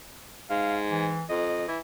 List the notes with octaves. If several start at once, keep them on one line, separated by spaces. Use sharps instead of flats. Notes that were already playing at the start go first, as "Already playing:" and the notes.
G#2 F5
E3
F2 D#5
E3